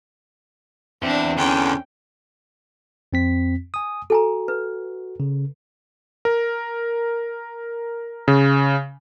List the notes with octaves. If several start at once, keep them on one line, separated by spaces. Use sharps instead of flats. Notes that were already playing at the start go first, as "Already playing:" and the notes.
E2 C4 D4
E2 D3 C#4 G5
F2 C4 B6
G#5 D#6
F#4 A4 G#5 A#5
B4
C#3
A#4
C#3